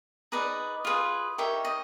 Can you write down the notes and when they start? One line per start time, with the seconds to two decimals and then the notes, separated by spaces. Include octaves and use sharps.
0.32 D#4 G#4 B4 D5 D#5
0.85 F4 G#4 B4
1.38 D#4 G4 A#4 C#5 E5
1.65 D#5